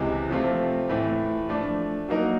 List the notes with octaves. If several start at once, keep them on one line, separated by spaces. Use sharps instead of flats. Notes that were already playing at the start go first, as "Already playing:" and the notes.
Already playing: C#2 C3 E3 G#3
C3 F3 A3 C4 F4
A2 E3 A3
F3 A3 D4
F#3 A#3 D#4 F#4 A#4